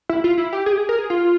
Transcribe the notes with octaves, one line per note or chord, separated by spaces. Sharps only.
E4
F4
E4
G4
G#4
G4
G#4
A#4
G#4
F4